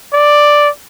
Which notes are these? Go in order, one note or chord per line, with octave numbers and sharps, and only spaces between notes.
D5